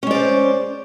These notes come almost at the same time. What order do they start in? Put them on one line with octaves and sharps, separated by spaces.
C#4 G#3 D5 C5